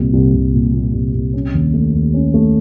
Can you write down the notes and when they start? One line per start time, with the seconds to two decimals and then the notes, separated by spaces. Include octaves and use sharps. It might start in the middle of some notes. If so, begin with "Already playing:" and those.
Already playing: C2 A#2
0.13 C2
0.33 C2
0.53 A#2
0.73 A#2
0.93 C2
1.14 C2
1.34 C#4
1.54 D#2
1.74 A3
1.94 D#2
2.14 C#4
2.34 A3